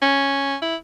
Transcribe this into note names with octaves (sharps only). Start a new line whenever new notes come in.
C#4
E4